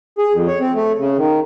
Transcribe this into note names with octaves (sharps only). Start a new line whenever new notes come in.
G#4
F2
C#5
C4
A3
C#3
D#3